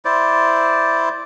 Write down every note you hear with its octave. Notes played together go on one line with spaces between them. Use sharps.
E4 C5 D5